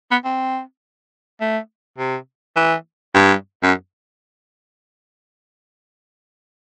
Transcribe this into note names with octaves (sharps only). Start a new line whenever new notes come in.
B3
C4
A3
C3
E3
G2
F#2